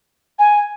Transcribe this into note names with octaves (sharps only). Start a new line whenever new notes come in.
G#5